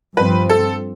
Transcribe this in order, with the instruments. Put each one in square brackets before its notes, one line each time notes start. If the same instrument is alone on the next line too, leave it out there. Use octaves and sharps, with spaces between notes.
[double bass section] G2 F3 C4 [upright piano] B4
[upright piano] A4